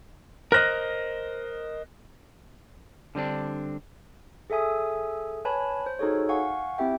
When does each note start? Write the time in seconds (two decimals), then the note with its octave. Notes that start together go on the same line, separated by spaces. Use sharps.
0.52 A#4 C5 D#5 F6 F#6 A#6
3.15 D3 G3 C4 D4
4.50 G#4 A4 E5 G#5 D#6
5.45 B4 C#5 G#5 A5 B5
5.86 C5
5.99 D#4 F#4 G#4 A4 C#5
6.29 F5 F#5 G#5 C#6
6.78 C4 E4 G4 E5 G5